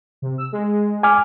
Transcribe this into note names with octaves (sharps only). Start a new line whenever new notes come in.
C3
E6
G#3
G#5 D6 F6